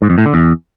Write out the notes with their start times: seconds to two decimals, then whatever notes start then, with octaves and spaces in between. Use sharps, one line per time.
0.02 G#2
0.10 F2
0.18 A2
0.26 D3
0.34 E2